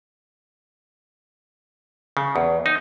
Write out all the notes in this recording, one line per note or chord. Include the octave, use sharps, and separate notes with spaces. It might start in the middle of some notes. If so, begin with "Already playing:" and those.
C#3
E2
D#4